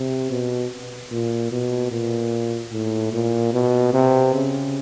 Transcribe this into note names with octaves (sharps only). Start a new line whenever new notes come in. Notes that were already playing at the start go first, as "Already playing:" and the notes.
Already playing: C3
B2
A#2
B2
A#2
A2
A#2
B2
C3
C#3